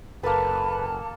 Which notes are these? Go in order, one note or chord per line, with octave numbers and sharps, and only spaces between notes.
F#1 A#3 A4 B4 A5